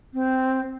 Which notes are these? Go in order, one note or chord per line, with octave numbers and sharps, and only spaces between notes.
C4